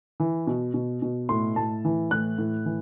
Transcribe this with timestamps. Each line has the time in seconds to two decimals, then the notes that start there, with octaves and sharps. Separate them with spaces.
0.20 E3
0.47 B2
0.74 B2
1.02 B2
1.29 A2 C6
1.56 A2 A5
1.85 E3
2.11 A2 F#6
2.38 A2
2.66 E3